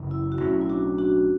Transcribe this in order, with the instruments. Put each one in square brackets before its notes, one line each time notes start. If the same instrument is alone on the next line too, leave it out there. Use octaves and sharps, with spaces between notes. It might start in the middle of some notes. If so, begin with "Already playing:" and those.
Already playing: [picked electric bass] F#1 F#2 C#3 E3
[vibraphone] E4
F#4
[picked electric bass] B1 A2 F#3 C#4 [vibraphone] E4
[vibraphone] E4
D4 F#4
D4 F#4